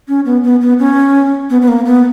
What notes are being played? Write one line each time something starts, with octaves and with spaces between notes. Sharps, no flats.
C#4
B3
B3
B3
C#4
B3
B3
A#3
B3